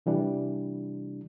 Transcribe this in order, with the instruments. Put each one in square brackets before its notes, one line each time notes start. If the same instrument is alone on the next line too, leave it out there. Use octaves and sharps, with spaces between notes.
[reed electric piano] C3 E3 G3 D4